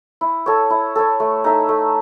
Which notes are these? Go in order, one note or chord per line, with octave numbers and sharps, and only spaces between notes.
E4
A4 C#5
E4
A4 C#5
A3
D#4 A4 E5
A3